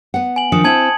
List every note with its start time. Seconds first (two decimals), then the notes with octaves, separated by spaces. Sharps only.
0.14 B3 F#5
0.36 G#5 F#7
0.52 D#3 F3 D4 D#6 C#7
0.64 C4 E4 A5 G#6 F#7